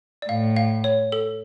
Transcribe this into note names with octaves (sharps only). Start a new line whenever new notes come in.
D5
A2 F5
F5
C#5
A4